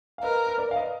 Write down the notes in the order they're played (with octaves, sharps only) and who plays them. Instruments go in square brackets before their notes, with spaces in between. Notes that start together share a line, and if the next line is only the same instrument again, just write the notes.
[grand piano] F5
[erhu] A#4 [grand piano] B4 D#5
[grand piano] B4
A#4 D5
F5
B4 D#5